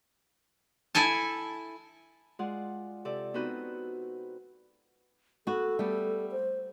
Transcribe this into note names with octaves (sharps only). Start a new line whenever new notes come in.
E4 A4 G#5 A5
G#3 F4 G#4 D5 F#5
C3 A4 D5
B3 C4 D#4 F#4 B4 C5
B3 F#4 A4
G3 A3 B3
C5